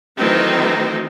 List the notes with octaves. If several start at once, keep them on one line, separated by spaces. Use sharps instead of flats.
D#3 E3 F#3 A3 C4 D#4